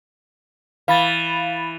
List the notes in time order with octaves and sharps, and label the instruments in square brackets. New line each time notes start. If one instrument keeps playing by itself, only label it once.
[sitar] E3 [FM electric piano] F5 B5 A6